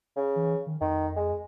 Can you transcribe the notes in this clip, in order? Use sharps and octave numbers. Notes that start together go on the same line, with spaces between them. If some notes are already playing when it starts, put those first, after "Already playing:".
C#3
E3
D#3
F2 D#3
G#3